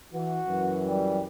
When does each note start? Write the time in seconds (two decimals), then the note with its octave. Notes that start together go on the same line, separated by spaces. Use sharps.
0.13 E3 F#4
0.47 F#2 E3
0.86 G3